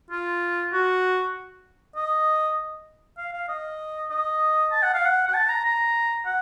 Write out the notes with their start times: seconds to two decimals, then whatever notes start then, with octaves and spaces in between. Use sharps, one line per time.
0.11 F4
0.73 F#4
1.96 D#5
3.18 F5
3.33 F5
3.49 D#5
4.11 D#5
4.72 A5
4.83 F#5
4.94 F5
5.05 F#5
5.28 F#5
5.34 A5
5.49 A#5
5.65 A#5
6.26 F#5